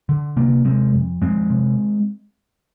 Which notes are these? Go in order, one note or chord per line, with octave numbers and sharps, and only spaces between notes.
D3
C3 A#3 D4
C3 G#3 C4
F2
F2 G#3 C4
C3